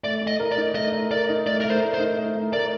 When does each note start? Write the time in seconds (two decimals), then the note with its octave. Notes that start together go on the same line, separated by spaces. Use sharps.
0.04 A3 D5
0.21 A3
0.27 D#5
0.40 A#4
0.52 D5
0.57 D#4
0.75 A3 D#5
0.92 A3
1.11 A#4 D5
1.29 D#4
1.46 A3 D5
1.61 A3 A#4
1.70 C5
1.82 A#4
1.94 C5
2.00 D#4
2.17 A3
2.35 A3
2.53 A#4 D5